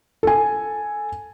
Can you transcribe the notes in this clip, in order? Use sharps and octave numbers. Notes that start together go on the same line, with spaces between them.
A4 G#5